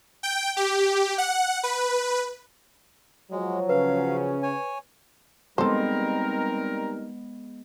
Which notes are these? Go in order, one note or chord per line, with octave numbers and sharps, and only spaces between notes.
G5
G4
F#5
B4
F3 F#3 G#3
C#3 C#4 B4 F5
C#5 G#5
G3 G#3 B3 C4 D#4 A4 A#4 C5